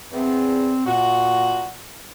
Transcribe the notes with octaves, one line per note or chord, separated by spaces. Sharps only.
E2 C4
A#2 F#4